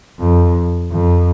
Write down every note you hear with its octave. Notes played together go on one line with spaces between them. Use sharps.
F2
F2